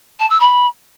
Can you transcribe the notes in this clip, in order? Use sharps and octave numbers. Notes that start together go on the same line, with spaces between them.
A5
E6
B5